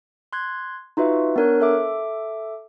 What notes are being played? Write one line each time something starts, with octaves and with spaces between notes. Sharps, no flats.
C6 F#6 G#6
D#4 F4 F#4 B4 E5
B3 D4 A#4 C#5 F#6
A4 E5 D6